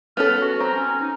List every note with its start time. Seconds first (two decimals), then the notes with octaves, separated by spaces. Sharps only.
0.17 B3 C#4 A4 F6
0.41 F#4
0.60 C4 A#5
0.74 C#4
1.01 D#4